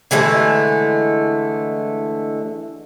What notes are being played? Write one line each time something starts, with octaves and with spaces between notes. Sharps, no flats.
D3 E3 G#3 A3